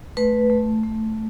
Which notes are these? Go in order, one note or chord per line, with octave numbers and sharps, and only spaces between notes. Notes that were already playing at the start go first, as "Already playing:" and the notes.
A3 B4
A3
A3